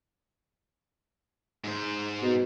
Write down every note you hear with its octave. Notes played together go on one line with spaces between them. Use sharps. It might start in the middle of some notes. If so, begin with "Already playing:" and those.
G#2 C5
B2